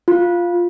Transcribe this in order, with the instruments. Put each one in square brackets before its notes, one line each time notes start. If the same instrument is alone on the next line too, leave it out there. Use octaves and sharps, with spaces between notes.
[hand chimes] F4